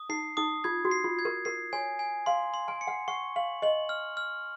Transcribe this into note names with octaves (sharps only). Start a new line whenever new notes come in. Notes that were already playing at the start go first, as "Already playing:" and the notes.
Already playing: D#6
D#4 C7
D#4 D#6
F4 G#6
F#4
C7
F4
G#6
A#4
A#4 C7
C#5 G#5
G#5
F5 C6
C6
G#5
C#7
F#5
F#5 C#6
F5 F#7
D#5 F#7
F6
F6